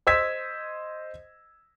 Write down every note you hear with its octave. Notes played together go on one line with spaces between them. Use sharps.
C5 D#5 E6 G#6 B6